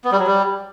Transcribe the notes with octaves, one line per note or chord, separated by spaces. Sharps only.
B3
G3
F#3
G3